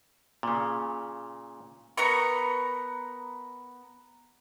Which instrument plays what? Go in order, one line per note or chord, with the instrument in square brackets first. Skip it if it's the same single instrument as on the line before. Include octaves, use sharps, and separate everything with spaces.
[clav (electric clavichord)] A#2 C#3
[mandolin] B3 A#4 A#5 C#6